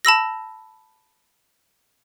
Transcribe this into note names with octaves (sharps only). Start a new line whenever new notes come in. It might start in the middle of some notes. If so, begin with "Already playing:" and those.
A5 B5 E6 A#6